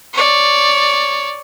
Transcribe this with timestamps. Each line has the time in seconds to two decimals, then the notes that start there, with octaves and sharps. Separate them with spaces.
0.13 C#5 D5